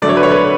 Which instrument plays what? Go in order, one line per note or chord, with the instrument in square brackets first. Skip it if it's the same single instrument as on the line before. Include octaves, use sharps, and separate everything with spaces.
[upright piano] D3 F#3 A3 D5
C#5
B4
C#5
B4